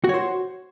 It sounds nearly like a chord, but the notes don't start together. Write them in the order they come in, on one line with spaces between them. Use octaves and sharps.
F#4 C#5 C5